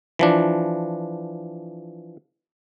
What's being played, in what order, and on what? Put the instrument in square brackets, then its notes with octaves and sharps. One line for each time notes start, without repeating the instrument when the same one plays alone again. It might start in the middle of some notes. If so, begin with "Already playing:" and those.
[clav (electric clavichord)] E3 F3 D4